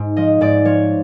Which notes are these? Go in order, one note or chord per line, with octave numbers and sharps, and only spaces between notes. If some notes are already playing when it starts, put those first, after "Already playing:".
Already playing: G#2
F3 D#5
G#2 D5
F3 C#5